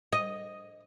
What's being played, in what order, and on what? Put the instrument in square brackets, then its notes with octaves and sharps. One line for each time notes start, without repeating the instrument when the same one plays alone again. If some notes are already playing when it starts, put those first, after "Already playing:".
[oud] D#5